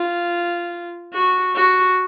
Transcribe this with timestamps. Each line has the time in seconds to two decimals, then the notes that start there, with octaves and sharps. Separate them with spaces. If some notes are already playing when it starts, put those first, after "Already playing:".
Already playing: F4
1.13 F#4
1.55 F#4